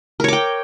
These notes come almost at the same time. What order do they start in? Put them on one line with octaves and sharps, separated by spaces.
A#4 C#5 D6 G5